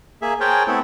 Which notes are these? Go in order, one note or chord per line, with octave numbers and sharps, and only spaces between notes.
A#3 G#4 E5
G#4 A#4 C5 C#5 G5 A5
A3 B3 C4 E4 A4